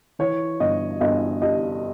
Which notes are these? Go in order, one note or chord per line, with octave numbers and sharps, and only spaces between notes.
E3 C#5
G1 D#5
G1 D#5
G2 D#5